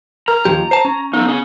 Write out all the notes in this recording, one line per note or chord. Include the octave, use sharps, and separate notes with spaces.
A#4 A#5
D#2 F3 G4
C5 A5
C#4
B3 D#4 A4
C#4 G#4